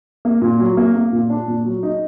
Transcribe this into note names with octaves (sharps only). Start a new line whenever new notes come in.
A#3
A#2
F#3
A#3
A#3
A#2
D4
A#2
F#3
D#4